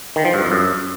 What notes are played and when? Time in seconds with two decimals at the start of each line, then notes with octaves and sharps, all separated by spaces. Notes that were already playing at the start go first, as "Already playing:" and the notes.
0.16 D#3
0.25 F3
0.34 G2
0.43 F2
0.52 F#2